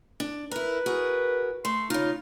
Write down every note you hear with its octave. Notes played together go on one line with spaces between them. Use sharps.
D4
E4 A#4 B4
F#4 G#4 A#4
A3 C6
C#3 D#4 F4